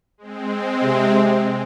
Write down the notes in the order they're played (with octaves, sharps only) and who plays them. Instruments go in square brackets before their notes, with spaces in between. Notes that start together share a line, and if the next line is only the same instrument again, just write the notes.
[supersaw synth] G#3 C4
[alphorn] C3